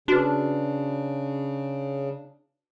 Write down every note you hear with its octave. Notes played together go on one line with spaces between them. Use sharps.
C#3 D4 F#4 B4